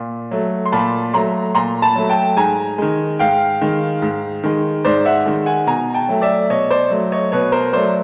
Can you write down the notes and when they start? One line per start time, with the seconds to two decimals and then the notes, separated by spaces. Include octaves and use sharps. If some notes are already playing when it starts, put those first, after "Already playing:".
Already playing: A#2
0.31 F#3 A3
0.66 C6
0.72 A#2 A5 B5
1.14 F#3 A3 A#5 C6
1.55 A#2 A#5 C6
1.82 A5 B5
1.96 F#3 A3
2.10 G5 A5
2.37 G#2 G#5 A#5
2.78 D#3 G#3
3.19 G#2 F5 G5
3.61 D#3 G#3
4.02 G#2
4.44 D#3 G#3
4.85 G#2 C5 D5
5.05 E5 F#5
5.26 D#3 G#3
5.46 F#5 G#5
5.67 B2 G#5 A#5
5.94 G5 A5
6.08 F#3 A3
6.22 D5 E5
6.50 B2 C#5 D#5
6.70 C5 D5
6.90 F#3 A3
7.12 C#5 D#5
7.32 B2 B4 C#5
7.52 A#4 C5
7.73 F#3 A3 C5 D5